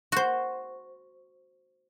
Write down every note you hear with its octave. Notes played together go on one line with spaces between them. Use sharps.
F#4 C5